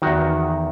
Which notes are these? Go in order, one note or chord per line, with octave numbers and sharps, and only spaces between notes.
E2 D#3 F#4